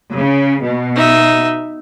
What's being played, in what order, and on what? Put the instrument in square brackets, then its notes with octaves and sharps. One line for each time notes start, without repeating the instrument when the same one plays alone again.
[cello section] C#3
B2
[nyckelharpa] D#4 E5